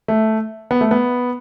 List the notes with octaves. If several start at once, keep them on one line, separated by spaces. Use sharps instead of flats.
A3
B3
A3
B3